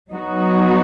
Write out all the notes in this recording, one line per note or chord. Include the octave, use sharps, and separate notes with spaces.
F#3 B3 D#4 F#4